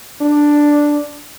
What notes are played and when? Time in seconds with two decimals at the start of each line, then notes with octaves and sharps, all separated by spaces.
0.21 D4